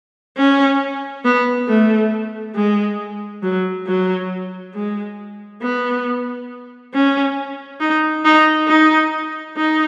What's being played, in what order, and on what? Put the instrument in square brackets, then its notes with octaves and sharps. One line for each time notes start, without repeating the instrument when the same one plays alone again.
[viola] C#4
B3
A3
G#3
F#3
F#3
G#3
B3
C#4
D#4
D#4
D#4
D#4